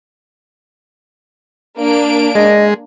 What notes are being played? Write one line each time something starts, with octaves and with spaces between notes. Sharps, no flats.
A#3 D4 D7
G#3 D#5